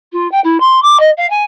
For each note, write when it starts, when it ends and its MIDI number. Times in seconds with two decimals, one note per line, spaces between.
0.12 0.30 65
0.31 0.40 79
0.44 0.58 64
0.60 0.82 84
0.82 0.97 86
1.00 1.10 75
1.17 1.29 77
1.30 1.44 80